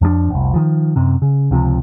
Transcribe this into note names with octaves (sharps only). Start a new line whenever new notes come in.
F2 F3 F#3 D4
F1 C2
D#3 F3
F#2 C3
C#3
C#2 C3 F3